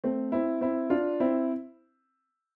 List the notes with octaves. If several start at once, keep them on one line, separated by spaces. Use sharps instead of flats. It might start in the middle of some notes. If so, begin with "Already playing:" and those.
A3 C4
C4 E4
C4 E4
D4 F4
C4 E4